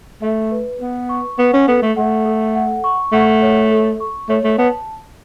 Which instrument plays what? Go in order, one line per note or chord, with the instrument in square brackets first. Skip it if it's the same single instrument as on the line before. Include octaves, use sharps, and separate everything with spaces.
[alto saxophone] A3 [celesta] E5
[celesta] B4
[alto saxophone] B3 [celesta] B4
[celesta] C#6
[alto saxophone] B3 [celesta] F#5
[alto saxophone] C#4
[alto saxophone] B3 [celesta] A4
[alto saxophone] A3
[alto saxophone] A3 [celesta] F#5
[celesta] A4
F#5
C#6
[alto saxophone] A3 [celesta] F#5
[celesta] C#5
A4
C#6
[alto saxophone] A3 [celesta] C#5
[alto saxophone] A3
[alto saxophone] B3 [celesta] A5